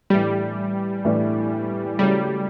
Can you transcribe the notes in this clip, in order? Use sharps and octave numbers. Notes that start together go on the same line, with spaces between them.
A2 E3 G3 A3 D4
A2 E3 A3 D4
C#3 F#3 G3 A3 C#4 E4